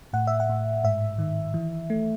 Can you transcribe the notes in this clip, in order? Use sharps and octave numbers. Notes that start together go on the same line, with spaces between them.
A2 F#5
E5
F#5
A2
G#2 E5
D#3
E3
A3